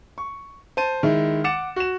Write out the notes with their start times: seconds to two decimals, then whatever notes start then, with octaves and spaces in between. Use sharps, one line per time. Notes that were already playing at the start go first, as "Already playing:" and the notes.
0.18 C#6
0.77 C5 A5 D#7
1.03 D#3 G#3 E4
1.44 F#5 D6 A6 C#7 E7
1.76 F#4 E7